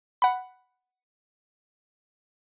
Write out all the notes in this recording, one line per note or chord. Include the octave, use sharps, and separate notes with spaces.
F#5 B5